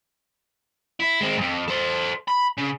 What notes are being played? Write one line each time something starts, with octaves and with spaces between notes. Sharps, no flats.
E4
G#3 C4
F2 G#2
A4 C5
B5
C#3